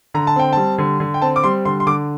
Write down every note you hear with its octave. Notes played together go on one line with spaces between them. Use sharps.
D3 A#5
A5
C4 G5
G3 A5
D3
D3
G5
C4 A5
D6
G3 C6
D3 C6
C6
D3 D6